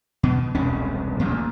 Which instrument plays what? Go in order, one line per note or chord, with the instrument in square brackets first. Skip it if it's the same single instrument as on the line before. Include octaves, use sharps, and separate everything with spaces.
[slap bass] B2
E1 C2 C#4
D2 A#2